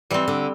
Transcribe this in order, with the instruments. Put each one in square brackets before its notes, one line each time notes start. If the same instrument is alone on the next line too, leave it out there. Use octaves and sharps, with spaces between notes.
[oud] E3 [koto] G3 C4
[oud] D3